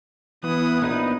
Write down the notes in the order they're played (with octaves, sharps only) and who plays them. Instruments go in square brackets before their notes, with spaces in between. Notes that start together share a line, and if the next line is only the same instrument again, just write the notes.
[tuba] E3 [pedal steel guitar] B3 [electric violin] E4 D#6
[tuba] A#1 [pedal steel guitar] B3 D#4 B4